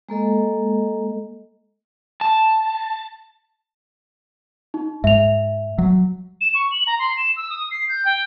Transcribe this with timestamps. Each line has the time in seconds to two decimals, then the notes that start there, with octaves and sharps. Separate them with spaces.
0.09 G#3 A#3 A4 D#5
2.21 A5
4.74 D#4
5.04 G#2 E5 F7
5.78 F#3
6.41 E7
6.54 C#6
6.71 F#7
6.87 A#5
6.99 C6
7.17 E7
7.36 E6
7.50 D#6
7.71 C7
7.89 G6
8.05 G5